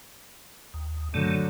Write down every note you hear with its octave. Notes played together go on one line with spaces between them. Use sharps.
D#2
G2 D3 D#3 F#3 A3